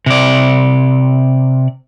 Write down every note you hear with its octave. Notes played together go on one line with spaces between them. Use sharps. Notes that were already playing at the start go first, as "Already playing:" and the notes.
C3 D5